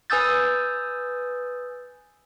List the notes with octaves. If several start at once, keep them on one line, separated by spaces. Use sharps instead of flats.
B4 G#5 D#6 E6 G6 A6